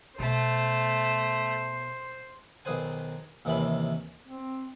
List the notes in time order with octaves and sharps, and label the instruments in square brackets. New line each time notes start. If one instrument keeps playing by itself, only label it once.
[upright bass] B2 [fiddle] A3 [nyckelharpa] C5
[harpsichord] B1 D#3 G#4 B4 C5 G#5
D#2 C3 D#3 E3 C#4 B5
[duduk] C4